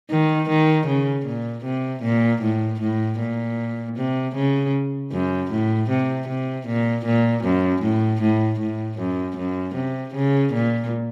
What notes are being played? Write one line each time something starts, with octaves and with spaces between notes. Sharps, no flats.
D#3
D#3
C#3
A#2
C3
A#2
A2
A2
A#2
C3
C#3
F#2
A2
C3
C3
A#2
A#2
F#2
A2
A2
A2
F#2
F#2
C3
C#3
A#2